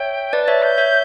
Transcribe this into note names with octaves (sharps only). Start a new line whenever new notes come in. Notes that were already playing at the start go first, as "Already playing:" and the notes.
Already playing: C#5 E5 G5
B4 D5 A5
C#5 E5
G6
C#5 E5